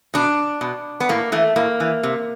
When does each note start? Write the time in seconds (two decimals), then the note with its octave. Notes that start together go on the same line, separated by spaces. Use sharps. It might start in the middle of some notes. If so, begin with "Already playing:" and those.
0.14 B2 D4
0.61 B2
1.00 B3
1.09 A2 A#3
1.32 E3 A3
1.56 A2 A#3
1.80 E3
2.03 C3